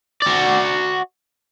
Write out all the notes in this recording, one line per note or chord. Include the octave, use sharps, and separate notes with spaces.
F#4 D5